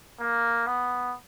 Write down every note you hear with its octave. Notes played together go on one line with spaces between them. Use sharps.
A#3
B3